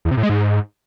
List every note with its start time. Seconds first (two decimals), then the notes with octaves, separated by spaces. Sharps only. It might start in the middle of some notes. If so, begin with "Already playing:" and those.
0.05 E2
0.11 C3
0.17 A2
0.23 G#3
0.29 G#2